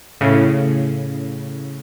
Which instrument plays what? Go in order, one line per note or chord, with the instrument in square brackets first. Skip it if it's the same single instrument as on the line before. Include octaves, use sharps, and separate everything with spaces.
[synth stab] A2 C#3